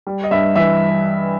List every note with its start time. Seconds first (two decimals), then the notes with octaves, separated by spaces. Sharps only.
0.07 G3
0.24 D#5
0.31 G2 E5
0.55 E3 E5